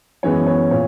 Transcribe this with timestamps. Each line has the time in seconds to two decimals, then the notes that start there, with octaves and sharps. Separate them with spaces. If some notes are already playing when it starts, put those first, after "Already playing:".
0.23 F#2 E3 G#3 B3 C#5
0.47 C#5
0.71 A#2 C#5